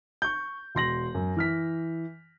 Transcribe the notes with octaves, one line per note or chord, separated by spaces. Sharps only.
C#6 G6
E1 C6 A#6 F#7
F#2
E3 F6 B6